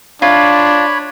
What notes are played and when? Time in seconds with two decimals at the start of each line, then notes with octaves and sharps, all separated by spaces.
0.22 D4 F4 C#5 B5